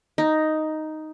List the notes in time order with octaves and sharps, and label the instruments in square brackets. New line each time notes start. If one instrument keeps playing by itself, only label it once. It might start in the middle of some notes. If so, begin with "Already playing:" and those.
[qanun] D#4